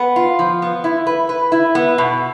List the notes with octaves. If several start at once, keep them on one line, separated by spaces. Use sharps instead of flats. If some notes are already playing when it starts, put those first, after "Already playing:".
Already playing: B3
F4
F3
B3
E4
B4
B4
E4
B3
B2